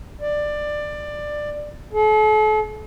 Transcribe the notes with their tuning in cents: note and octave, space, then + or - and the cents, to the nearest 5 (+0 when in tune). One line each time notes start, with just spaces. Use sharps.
D5 +15
A4 -40